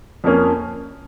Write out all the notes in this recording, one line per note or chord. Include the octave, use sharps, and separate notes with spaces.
F2 F3 A#3 C#4